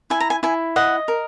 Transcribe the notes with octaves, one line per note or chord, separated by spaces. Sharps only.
E4 G#5
A#5
G#5
E4 G#5
D#5 F#5
A#4